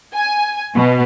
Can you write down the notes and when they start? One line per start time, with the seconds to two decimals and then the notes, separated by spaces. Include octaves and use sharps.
0.13 G#5
0.74 B2